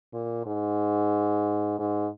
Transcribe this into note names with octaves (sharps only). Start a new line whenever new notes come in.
A#2
G#2
G#2